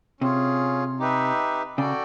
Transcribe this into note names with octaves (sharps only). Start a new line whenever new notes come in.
C3 C#4 F4 G#4
D#4 G4 B4 E5
C#3 F#4 A4 D5 G5